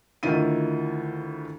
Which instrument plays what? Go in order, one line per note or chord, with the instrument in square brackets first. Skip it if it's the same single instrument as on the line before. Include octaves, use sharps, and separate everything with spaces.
[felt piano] D2 D#3 E4 F4 D#7